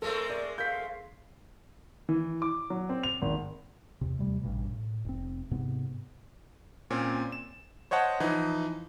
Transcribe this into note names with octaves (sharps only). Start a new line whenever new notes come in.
G#3 A3 C4 A4 A#4
D5
A#4 F5 G6 B6
E3
D6
F#3
C4
F7
G#1
E2 C3
D#2 C3 G3 A3
A1 G2 B2
A2
F1 C4
G#2 C3 B3
A#2 C4 C#4
E7
C5 C#5 D#5 F#5 A5
E3 F3 D#4